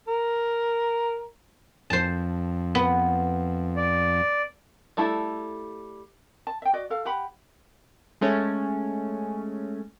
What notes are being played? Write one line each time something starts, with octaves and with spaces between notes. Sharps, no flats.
A#4
F2 C5 A5
B3
D5
G3 A3 E4 A4
A5
E5 G5
F#4 D5 D#5
A4 F5
G4 F#5 B5
G#3 A3 C#4